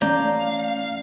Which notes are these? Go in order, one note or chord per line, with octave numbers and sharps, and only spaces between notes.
E3 A3 C#4 D5 F5 A#5 G6